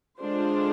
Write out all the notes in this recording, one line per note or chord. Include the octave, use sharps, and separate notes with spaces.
D3 G#3 D4 F4 C5